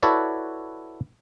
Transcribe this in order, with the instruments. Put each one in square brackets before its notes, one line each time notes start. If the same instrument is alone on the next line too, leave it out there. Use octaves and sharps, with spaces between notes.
[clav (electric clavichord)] E4 F#4 A4 B4 C#5 D5